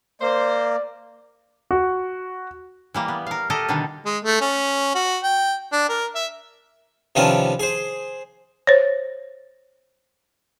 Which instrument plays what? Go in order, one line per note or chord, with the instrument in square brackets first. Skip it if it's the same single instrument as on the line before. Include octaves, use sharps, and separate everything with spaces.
[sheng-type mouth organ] A#3 [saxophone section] C5 [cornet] D5
[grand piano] F#4
[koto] E3 G3 A#3
B3
A#4 F5
G4 A4 A#4 D#5
B2 D3 D#3 G3 D4
[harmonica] G#3
A3
C#4
F#4
G5
D4
A#4
E5
[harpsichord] C3 D#3 F3 B3 C#4 D4
G#4 C5
[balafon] C5 C#5